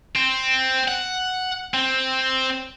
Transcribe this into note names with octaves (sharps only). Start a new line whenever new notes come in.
C4
F#5
C4